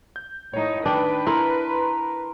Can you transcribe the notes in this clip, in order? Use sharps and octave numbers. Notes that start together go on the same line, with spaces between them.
G6
A2 D#4 C#5
D#3 D4 B4 G5
E4 A#4 C6